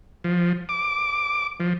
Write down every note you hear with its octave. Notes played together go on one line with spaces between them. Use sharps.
F3
D6
F3